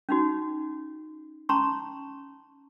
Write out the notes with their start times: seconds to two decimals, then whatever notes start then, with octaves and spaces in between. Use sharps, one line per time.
0.09 C#4 D#4 F#4
1.49 C#4 A5 A#5 C6 C#6